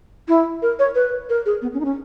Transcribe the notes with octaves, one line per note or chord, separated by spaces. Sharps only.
E4
A#4
C#5
B4
A#4
G#4
B3
C#4
D#4
C#4